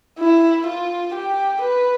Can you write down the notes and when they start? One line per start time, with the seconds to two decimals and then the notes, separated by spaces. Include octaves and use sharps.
0.19 E4
0.67 F4
1.15 G4
1.62 B4